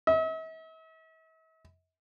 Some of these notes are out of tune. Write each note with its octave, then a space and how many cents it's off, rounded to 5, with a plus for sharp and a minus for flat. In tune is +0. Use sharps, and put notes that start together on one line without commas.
E5 -45